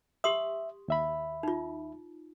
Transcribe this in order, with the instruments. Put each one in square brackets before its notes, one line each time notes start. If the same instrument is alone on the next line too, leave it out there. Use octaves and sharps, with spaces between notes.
[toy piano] G4 C6 D#6 [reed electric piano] E5
[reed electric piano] D#2 E5 B5
[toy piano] D#4 F4